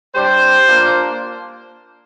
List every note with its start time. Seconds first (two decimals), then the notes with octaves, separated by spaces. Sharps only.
0.14 G3 D4 G4 C5
0.66 A#3 D4 F4